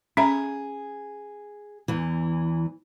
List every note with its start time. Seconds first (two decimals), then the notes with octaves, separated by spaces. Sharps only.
0.17 C#4 G#4 E5 A#5
1.88 E2 E3